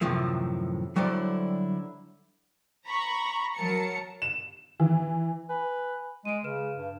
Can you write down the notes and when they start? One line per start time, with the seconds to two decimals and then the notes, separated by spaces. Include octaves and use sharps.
0.01 F#2 A2 C3 D#3 F3 A3
0.96 D3 F#3 G3 E4 A4 C5
2.87 A#5 B5 C#6
3.56 F#3 A#4 A5 C#7
4.22 E7
4.80 E3
5.49 B4 G#5
6.25 G#3 D7 D#7
6.44 C#3 B4 F6 E7
6.76 G2